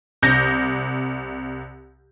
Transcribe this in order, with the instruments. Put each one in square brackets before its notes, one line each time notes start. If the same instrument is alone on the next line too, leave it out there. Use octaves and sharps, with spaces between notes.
[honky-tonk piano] C2 G6 A#6